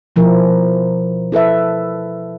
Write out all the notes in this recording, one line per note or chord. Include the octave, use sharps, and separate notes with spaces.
B2 F3 E4 A#4
E4 A4 B4 E5